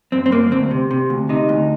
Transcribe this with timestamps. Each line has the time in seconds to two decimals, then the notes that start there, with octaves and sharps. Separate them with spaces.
0.12 F#2 C4
0.26 C4
0.32 F#2 A#3
0.51 D2 C4
0.71 C3
0.91 C3
1.10 D2
1.29 C3 D#4
1.49 D2